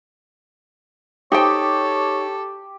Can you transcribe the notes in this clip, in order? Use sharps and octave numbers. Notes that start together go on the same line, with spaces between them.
D#4 G4 A4 C5 C#5 G5